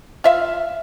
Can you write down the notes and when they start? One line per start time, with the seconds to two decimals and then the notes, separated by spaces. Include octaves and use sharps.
0.24 F4 E5 F5